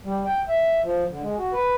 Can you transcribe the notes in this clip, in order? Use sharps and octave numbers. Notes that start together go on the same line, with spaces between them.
G3
G5
E5
F3
D3
G#3
F#4
B4